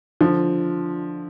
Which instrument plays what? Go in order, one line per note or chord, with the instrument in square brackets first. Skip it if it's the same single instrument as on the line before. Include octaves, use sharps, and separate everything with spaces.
[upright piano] D3 F3